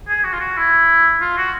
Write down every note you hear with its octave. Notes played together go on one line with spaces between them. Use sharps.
G#4
F#4
F4
F#4
E4
F4
F#4